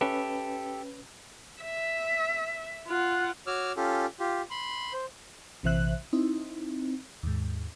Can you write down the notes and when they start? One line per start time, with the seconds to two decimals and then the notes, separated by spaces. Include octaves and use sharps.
0.01 C#4 G4 A4 B4 E5
1.62 E5
2.88 F4 F#5
3.47 F#4 C#5 D6 E6 F6
3.76 C#4 F4 G4 A4
4.20 F4 G4
4.50 B5 C6
4.93 C5
5.63 A#1 C3 E3 C5 E5 F#6
6.13 C4 D#4 E4
7.23 D#2 G#2